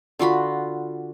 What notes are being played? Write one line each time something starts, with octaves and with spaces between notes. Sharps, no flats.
D3 F4 F#4 B5